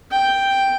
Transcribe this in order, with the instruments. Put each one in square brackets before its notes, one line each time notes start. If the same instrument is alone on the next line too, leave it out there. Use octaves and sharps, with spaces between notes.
[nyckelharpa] G5